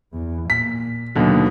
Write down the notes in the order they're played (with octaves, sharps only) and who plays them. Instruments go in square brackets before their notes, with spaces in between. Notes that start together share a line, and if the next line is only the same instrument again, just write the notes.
[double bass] E2
[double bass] A#2 [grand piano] B6
[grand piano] D#2 B2 D3 [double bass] F#3 A#3